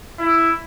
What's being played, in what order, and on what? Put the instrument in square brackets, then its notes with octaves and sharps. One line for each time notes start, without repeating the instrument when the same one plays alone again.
[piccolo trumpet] E4